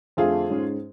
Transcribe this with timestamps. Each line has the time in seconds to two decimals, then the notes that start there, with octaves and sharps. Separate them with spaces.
0.17 F2 D3 F3 A3 F4 G#4
0.50 G#2 G#3 C#4